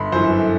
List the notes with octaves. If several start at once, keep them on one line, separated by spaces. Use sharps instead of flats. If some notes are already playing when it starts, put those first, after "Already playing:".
Already playing: G1 B5 C6
F#2 E3 C5
A4